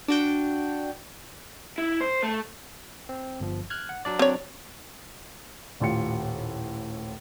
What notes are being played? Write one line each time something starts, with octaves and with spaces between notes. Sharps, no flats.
D4 F#4 G5
E4
C5
A3
C4
G1 F3
F6 F#6 G#6
F#5
F#3 D4 D5
C4 C#5
D#1 A2 F4 G4 C#7